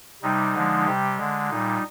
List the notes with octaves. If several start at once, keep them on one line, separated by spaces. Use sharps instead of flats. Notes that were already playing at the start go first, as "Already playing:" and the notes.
C3 G3 D#4
D3 F3 G#3
C3 G3 G4
D3 G#3
A#2 G3 D#4